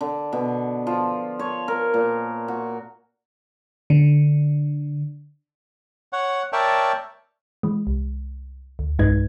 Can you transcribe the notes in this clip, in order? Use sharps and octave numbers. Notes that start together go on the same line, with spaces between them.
D3
B2
F3
C#5
A#4
A#2
F#4
D3
C#5 F#5
A#4 C#5 D5 E5 G5 A5
E3 G#3
C2
D2
B1 G2 G#3 D#4 B4 G#6